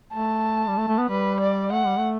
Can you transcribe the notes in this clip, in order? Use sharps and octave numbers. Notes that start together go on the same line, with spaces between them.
A3 A5
G3
A3
A3
B3
G3 B4
D5
A3 F#5
G3
A3